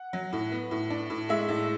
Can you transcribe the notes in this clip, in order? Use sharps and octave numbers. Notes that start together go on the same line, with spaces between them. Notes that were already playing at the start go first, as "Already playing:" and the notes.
Already playing: F#5
F#3
A2
B3
A2
D4
A2
G#3 E5
A2